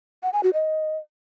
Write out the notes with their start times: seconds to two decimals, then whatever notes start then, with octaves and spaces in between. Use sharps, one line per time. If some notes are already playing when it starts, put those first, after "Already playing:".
0.23 F#5
0.33 G#5
0.43 F#4
0.54 D#5